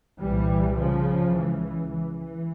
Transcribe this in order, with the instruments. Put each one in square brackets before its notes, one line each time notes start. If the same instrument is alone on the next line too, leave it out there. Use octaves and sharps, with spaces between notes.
[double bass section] C2 A#2 E3 G3
C#3 F3
C#2 C#3 E3
E3
E3
E3